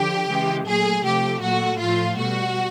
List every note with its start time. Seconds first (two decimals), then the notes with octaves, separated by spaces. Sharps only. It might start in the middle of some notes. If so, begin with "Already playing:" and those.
Already playing: D3 F3 G4
0.28 C#3 E3 G#3
0.67 A#2 F#3 A3 G#4
1.04 C3 F3 A3 G4
1.42 A#2 F#3 A3 F#4
1.80 A2 F3 A3 F4
2.17 B2 G3 F#4